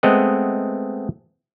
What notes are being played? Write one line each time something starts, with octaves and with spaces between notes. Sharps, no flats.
G#3 A3 B3 C4 D#5 F#5